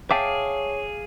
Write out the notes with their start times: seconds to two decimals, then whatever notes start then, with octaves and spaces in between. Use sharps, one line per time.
0.11 G#4 C#5 E5 F5 G5 A5 D6